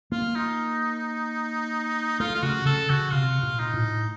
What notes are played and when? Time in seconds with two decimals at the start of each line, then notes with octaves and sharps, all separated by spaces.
0.12 A#3 F4
0.35 D#4
2.20 A3 F4
2.35 F4
2.43 C#3 F#4
2.65 C#3 A4
2.90 C#3 F#4
3.12 C3 F4
3.43 A#2
3.59 D#4
3.74 A2